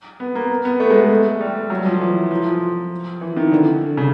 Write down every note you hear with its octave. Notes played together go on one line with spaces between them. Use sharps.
B3
A#3
B3
A3
G#3
A3
G3
F#3
F3
E3
F3
F3
E3
D#3
D3
C#3